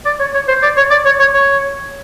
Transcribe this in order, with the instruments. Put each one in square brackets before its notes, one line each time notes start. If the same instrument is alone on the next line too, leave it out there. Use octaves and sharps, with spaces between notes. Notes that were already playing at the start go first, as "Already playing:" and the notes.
[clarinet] D5
C#5
C#5
C5
D5
C#5
D5
C#5
C#5
C#5